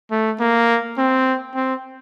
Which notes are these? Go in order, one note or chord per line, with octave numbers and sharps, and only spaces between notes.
A3
A#3
C4
C4